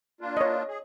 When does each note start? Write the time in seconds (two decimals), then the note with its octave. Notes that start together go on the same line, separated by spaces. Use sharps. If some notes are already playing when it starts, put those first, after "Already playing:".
0.21 A#3 D4 F4
0.37 C#5 D#5
0.68 G#4